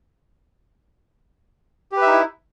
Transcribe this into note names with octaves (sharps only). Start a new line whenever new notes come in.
D#4 E4 G4 B4 E5